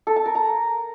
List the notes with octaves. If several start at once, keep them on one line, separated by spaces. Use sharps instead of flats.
A4
A5
A#4
A#5